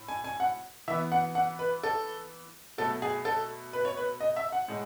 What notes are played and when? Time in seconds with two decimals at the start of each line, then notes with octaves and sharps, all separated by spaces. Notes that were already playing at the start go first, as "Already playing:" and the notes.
Already playing: A2
0.09 G#5
0.24 G#5
0.40 F#5
0.88 E3 E5
0.91 B3
1.12 F#5
1.35 F#5
1.59 B4
1.83 A4
2.78 B2 F#3 A3 A4
3.02 G#4
3.25 A4
3.73 B4
3.85 C#5
3.97 B4
4.20 D#5
4.36 E5
4.52 F#5
4.68 A2 G#3